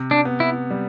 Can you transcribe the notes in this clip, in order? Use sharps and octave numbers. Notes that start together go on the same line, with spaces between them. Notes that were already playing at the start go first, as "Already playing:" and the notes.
Already playing: C3
D4
B3
E4
G3